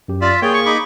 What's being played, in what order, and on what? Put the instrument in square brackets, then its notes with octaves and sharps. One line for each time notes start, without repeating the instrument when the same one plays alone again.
[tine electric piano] F#2 G4
[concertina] F4 [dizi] D5 [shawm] E5
[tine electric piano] A#3 [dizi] G#4 [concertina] C#5 [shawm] G5
[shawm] C#6
[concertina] D#4 B5 D6